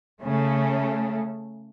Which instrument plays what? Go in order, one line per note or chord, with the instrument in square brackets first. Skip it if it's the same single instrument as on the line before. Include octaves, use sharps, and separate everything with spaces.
[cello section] C#3 A3